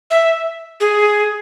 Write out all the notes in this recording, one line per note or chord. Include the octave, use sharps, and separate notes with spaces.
E5
G#4